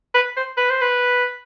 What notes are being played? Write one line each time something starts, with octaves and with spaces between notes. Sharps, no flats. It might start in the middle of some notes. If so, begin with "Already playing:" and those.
B4
C5
B4
C5
B4